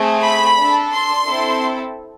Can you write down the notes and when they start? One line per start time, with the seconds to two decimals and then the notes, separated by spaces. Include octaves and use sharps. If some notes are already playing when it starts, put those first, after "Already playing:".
Already playing: A3 C4 G#4
0.25 B5
0.59 D4 A4
0.93 C6
1.26 C4 E4 A4